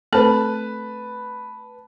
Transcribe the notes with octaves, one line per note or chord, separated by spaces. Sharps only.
A3 C4 A4 B4 A5